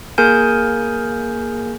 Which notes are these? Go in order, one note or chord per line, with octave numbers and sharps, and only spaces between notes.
A#3 G#4 A#4 G#5 G6